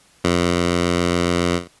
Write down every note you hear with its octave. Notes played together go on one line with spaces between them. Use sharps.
F2